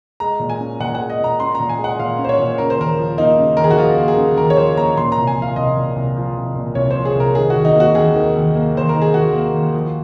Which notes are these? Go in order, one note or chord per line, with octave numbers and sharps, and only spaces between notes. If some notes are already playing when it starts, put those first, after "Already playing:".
G#3 A#5
A#2
G#5
C#4
A#2 F#5
F#5
G#3
D#5
A#2 A#5
C#4 C6
A#5
A#2
G#5
G#3
F#5
A#2 F5
C#4
C5
C#5
A#2
C#3 A#4
C5
D#2 A#4
F3
A#3 D#4
C#3
D#2 A#4
G#4
F#4
F3 F4
A#3
G#4
C#3
D#2 A#4
C#5
F3 C5
A#3 A#5
A#2 C6
A#5
C2
G#5
F3
F5
C2 D#5
A#2
C2
F3
C2
A#2
C2 C#5
C5
F3
G#4
C2 A#4
D#3 G#4
D#2 F#4
D#4
A#3 F#4
D#2 G#4
D#3
D#2
A#3
D#2 C5
D#3 A#4
G#4
D#2 F#4
A#3
D#2
F3